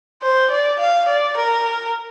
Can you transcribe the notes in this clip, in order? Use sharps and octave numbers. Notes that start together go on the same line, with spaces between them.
C5
D5
F5
D5
A#4